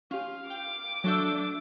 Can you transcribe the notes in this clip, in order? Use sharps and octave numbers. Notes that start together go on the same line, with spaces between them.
C#4 F4 G4 F5
G5 D6
F#3 A3 D4 A4 E5 C#6 G6